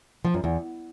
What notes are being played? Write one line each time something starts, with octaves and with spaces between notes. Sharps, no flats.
F3
F#2
E2